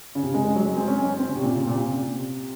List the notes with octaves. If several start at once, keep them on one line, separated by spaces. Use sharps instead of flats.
C#3
C3
G#3
G#3
F#3
G#3
C4
C#4
C#4
C4
C4
C#3
C3
A#2
C3
C#3
A#2
C3